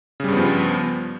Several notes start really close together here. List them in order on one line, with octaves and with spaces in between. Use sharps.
C#3 G3 G2 B3 F3